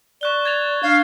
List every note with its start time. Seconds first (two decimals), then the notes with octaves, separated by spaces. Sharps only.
0.21 D5 C#6 F#6 G7
0.45 G#6 A6 F7
0.83 D4 F5